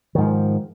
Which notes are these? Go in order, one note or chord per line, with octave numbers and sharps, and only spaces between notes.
G#2 D#3 F3